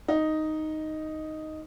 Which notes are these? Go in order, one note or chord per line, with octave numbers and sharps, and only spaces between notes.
D#4